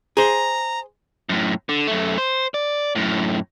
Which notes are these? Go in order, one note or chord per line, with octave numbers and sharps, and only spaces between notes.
G#4 C5 A#5
F#2 A2
D3
F#2 A3
C5
D5
F#2 A2